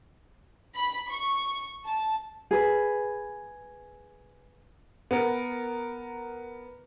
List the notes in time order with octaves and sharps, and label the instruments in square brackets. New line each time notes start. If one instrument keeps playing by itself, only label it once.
[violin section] B5
C#6
A5
[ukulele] G#4 B4
[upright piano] B3 A#4